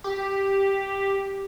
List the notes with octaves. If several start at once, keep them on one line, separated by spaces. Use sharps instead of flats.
G4